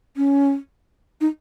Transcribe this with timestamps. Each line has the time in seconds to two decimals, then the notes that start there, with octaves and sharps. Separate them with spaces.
0.17 C#4
1.21 D#4